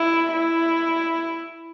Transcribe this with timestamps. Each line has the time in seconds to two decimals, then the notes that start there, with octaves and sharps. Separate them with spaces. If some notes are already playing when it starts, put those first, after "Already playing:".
Already playing: E4
0.33 E4